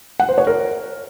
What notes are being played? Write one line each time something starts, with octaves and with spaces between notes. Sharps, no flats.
F#5
C5
C#5
A#4